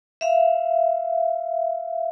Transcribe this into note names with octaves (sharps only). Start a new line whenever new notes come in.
E5 F5